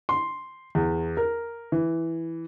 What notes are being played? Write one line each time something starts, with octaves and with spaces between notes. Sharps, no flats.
C6
E2
A#4
E3